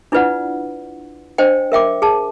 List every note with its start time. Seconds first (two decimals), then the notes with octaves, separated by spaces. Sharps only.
0.12 D4 E4 F4 B4 D5 F#5
1.38 D4 C5 D#5 G5
1.72 A#4 E5 G5 D6
2.02 G#4 A5